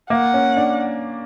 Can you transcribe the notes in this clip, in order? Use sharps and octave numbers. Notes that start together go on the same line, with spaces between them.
A#3 F#5
C#4
D4